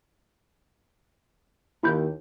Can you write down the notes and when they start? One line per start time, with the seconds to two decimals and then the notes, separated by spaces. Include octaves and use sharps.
1.83 D#2 E4 B5 G6